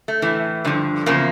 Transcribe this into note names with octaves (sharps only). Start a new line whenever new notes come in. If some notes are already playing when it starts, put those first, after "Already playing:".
A3
A2 E3
G2 D3 F3
E2 C#3 F3 A#3